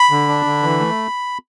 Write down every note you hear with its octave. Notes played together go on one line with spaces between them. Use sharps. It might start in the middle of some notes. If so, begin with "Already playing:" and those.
Already playing: B5
D3
D4
D3
E3
A3